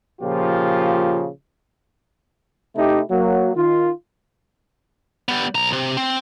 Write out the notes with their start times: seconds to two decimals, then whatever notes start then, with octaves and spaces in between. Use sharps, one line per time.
0.21 A#2 C#3 F3 F4 G4
2.76 C3 A3 D#4 E4 G4
3.11 F#3 A#3
3.56 D#3 F4
5.29 G3 B3
5.55 B1 A#5
5.73 C3
5.97 C4